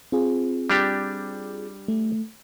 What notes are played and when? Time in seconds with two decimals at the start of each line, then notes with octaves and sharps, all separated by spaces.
0.12 C4 F4 G#4
0.70 G3 D4 G4
1.88 A3